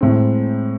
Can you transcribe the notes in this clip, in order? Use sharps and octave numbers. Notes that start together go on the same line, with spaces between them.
A2 G#3 C4